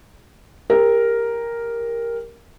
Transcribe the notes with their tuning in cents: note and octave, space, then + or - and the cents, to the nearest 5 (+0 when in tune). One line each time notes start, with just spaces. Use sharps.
G4 +30 A#4 +0